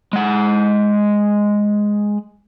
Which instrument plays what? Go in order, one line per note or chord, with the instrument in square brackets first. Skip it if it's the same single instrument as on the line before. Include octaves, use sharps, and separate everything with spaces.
[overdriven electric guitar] G#3 F#5